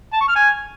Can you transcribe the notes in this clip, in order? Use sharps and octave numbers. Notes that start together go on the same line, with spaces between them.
A5
C#6
F6
G#5